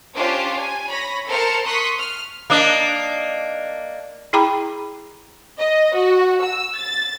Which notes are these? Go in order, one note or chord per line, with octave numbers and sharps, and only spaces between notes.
C#4 D4 F4 G4 C5
G#5
C#5 B5 A#6
A4 A#4 C5 A5 F6 C#7
C6 C#6 D#6 F#6 B6
F6
A#3 D4 D#5
E4 G#4 G5 A#5 B5 D6
D#5
F#4
E6
A6